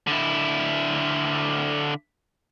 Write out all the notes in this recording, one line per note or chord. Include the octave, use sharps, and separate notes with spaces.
D3 E4